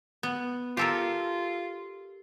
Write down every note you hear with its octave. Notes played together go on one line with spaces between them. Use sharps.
B3
F4 G4 A4 A#4